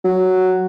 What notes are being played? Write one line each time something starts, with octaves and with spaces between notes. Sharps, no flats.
F#3